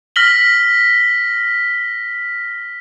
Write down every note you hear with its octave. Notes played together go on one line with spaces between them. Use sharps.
F6 A#6 B6 F#7 G7